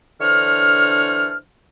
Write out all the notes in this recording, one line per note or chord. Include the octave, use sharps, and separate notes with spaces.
D3 E3 D4 C5 C#5 F6